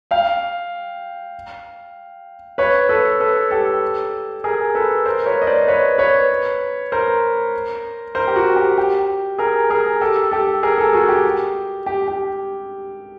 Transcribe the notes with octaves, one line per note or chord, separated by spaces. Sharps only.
F5 G5
B4 C#5
A4 B4
A4 B4
G4 A4
G#4 A#4
A4 B4
A#4 C5
B4 C#5
D#5
C5 D5
B4 C#5
B4 C#5
A#4 C5
A#4 C5
G4
F#4
G4
G4
G#4 A#4
G#4 A#4
G4 A4
G4 A4
G#4 A#4
G4 A4
F#4 G#4
G4
G4
G4